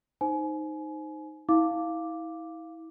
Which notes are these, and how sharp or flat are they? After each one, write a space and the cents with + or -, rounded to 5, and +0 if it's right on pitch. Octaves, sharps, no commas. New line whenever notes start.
D#4 +0 C5 +0 G#5 +30
E4 -35 F5 +0 D6 +0